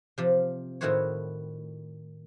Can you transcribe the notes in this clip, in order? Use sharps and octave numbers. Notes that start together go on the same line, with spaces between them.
C3 F3
A2 D#3 E4 F#4 C5 C#5